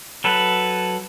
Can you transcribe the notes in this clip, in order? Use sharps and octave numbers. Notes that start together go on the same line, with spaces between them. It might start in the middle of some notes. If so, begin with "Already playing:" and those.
F#3 A4 B4